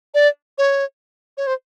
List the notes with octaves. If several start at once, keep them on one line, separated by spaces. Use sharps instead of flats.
D5
C#5
C#5
C5